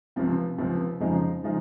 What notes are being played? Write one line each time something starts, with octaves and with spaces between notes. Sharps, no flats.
C#2 C3 F3 C4
C#2 C3 F3 C4
F2 C#3 F3 G#3 D#4
C#3 F3 G#3 D#4